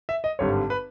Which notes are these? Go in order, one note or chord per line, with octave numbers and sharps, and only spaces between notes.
E5
D#5
G#1 G2 D3 G3 C#5
B4